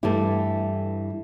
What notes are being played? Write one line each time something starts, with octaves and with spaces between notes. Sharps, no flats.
G2 E3 A3 E4 G4